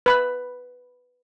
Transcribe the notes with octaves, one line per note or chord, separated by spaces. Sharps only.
B4 B5